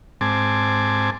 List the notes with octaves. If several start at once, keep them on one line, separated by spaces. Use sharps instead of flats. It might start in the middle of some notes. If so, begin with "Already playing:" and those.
G#2 C4 G#5 A5 D6